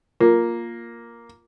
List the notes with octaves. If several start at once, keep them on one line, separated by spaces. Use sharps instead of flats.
A#3 F4